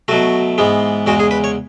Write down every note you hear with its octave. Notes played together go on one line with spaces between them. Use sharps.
B2 F#3 A3 F#4
G#2 E3 G#3 B3
E2 C#3 G#3 F#4
G#4
B4
C#5